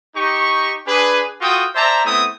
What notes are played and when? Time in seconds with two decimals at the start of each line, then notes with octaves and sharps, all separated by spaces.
0.16 D#4 G4 C#6
0.87 D4 G#4 B4
1.41 F4 F#4 A4 G5 D#6
1.75 C5 D5 E5 A5 A#5
2.05 A3 B3 C4 E4 E5 D#6